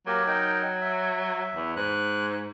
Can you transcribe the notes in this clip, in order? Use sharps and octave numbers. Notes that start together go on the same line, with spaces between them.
F#3 A#3 G4 A#4
D#4 A#4 G5
E5
E2
G#2 F#6